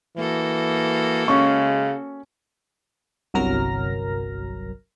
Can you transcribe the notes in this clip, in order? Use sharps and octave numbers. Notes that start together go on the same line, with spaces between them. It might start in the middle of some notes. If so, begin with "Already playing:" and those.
E3 A#3 F#4 A4
C#3 G#3 C#4 C#6
G1 C2 F#3 A#4 F6 A#6